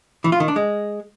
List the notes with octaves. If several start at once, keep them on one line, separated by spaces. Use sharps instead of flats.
E3
F4
D#3
D4
G#3